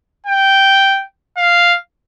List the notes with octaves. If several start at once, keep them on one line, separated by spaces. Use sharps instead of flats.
G5
F5